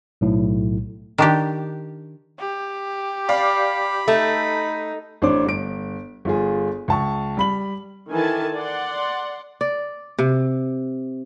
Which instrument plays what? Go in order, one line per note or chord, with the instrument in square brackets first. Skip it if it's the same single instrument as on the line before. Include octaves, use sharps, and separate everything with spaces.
[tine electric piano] B1 A2
[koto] D#3 D4 G4
[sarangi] G4
[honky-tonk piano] D5 F5 [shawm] B5
[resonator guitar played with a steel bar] A3 [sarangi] D#4 [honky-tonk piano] A4
[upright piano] A1 D4 C5 C#5 D6
G1 D7
G1 F4 G#4
C#2 A5 C#6
G3 B5 F#7
[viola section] D#3 E3 A4 G#5 A5
D5 F#5 C6
[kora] D5
C3